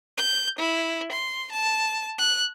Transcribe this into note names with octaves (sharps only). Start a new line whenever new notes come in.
G6
E4
C6
A5
F#6